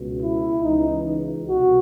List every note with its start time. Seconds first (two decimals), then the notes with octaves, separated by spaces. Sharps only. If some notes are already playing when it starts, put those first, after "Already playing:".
Already playing: C#2 B2
0.21 E4
0.63 C#2 C#3 E3 D#4
1.48 C2 B2 F#4